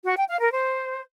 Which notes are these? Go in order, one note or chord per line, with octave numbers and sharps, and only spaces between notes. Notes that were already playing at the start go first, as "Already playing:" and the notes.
F#4
G5
F5
A#4
C5